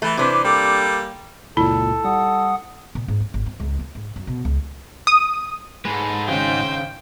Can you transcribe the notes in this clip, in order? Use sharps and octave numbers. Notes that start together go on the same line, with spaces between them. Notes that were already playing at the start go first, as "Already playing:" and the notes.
E3 A3
C3 E3 D4 B4 C5
G3 A#3 A4
C#2 F#2 A#2 E4 A4
G3 F#5 D#6
A#2
G#2
C4
G#1
C4
C#2
A#3
G#2
F#2
B2
C#2
D#6
G#2 G#3 A4 B4
G#1 C#3 D#4 C5 G5